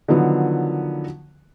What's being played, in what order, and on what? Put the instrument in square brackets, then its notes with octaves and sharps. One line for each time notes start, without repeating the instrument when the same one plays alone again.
[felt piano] D3 D#3 F3 F#3 B3